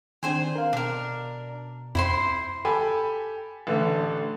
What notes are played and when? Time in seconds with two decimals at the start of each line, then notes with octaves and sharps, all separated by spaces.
0.23 D#3 C4 D4 G#4 C5 G#5
0.55 A#4 F5
0.73 B2 D4 A#4
1.95 F2 E4 C5 C6
2.65 G4 A4 G#5 B5
3.67 A1 D3 A3